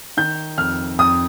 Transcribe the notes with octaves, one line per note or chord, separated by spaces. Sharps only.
D#3 G6
F2 F6
F2 D#6